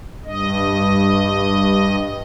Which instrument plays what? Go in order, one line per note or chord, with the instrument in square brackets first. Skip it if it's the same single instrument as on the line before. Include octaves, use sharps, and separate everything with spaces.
[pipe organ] G2 D#5